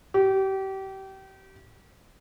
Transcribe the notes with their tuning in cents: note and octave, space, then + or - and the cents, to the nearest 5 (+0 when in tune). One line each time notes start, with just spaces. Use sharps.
G4 -30